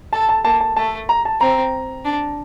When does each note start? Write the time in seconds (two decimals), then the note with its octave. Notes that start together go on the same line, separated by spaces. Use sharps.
0.13 A4 A5
0.29 A5
0.45 A#3 A5
0.61 A5
0.76 A3 A5
1.09 A#5
1.25 A5
1.41 C4 A#5
2.05 D4